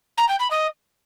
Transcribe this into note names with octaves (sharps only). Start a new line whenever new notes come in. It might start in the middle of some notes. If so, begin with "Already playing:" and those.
A#5
G5
B5
D#5